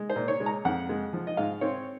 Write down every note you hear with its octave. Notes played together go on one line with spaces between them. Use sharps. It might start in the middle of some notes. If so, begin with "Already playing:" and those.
Already playing: G#3
C5
A#2
C#5
G#3
A#5
F2 F#5
G#3
F3
D#5
G#2 F5
C4 C#5